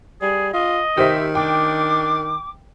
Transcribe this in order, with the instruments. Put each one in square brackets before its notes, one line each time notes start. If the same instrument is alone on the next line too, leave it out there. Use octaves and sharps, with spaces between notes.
[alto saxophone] G3 [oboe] G#4
[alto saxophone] F4 [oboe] D#5
[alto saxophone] D#3 [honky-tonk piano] G4 C5 E5
[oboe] D4 [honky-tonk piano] G5 [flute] D6